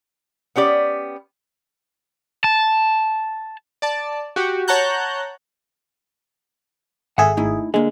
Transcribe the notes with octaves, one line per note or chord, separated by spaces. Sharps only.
B3 C#4 G4 D5
A5
D5 A5
F#4 G4
C#5 F#5 A5 A#5 F#6 G6
G#1 G#4 A4 E5 F#5
A3 D#4 E4
D3 G#3 A#3